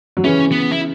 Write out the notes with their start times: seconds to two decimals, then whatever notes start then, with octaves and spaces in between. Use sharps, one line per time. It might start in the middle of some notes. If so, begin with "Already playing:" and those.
0.17 F#3
0.24 C#3 E3 C#4
0.52 B3
0.71 E4